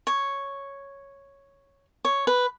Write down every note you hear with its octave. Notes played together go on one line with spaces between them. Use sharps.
C#5
C#5
B4